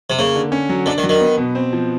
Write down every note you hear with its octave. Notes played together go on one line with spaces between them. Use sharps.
C3
C#3 A#3
D3
C#4
F#3
D3 D4
D#3
F#3
D#3
B3
B2
C4
F3